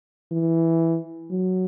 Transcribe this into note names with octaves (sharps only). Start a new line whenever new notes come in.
E3
F#3